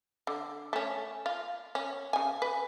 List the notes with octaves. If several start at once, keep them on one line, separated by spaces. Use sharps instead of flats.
D3
A3 C#4
F4
C#4
C#3 G#5
B4